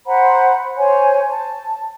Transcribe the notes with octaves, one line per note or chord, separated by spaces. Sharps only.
C5 F#5 A#5 B5
C5 C#5 G#5
A5